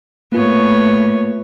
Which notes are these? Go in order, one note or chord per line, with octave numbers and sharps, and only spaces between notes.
A2 A#3 B3 F4 C#5